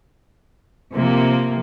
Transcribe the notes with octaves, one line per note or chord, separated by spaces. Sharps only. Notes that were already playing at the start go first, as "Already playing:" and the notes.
C3 F3 A#3